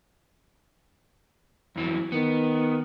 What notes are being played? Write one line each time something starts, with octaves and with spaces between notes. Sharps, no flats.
F2 E3 F#3
D#3 B3